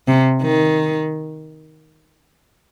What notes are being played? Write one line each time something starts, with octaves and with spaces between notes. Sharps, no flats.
C3
D#3